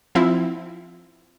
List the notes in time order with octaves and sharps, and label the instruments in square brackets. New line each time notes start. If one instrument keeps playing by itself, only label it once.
[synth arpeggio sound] F3 C4 E4 F4